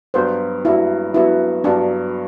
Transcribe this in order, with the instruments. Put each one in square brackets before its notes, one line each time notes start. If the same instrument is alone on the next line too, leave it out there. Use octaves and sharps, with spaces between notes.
[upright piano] G2 F#3 B3 F#4 [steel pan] C5
[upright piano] G2 F#3 B3 F#4 [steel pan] E4
[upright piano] G2 F#3 B3 F#4 [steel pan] E4
[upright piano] G2 F#3 B3 F#4 [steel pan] D4